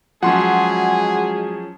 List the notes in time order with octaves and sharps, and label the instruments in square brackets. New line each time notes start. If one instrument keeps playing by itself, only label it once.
[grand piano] F3 F#3 C#4 [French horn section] G#3 F#4 [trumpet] G#4 [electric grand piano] F#5 C6